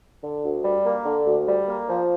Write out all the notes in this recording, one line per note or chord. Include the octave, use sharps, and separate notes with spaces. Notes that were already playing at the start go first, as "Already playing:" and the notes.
D3
D2
G3
A#3
D3
D2
G3
A#3
F3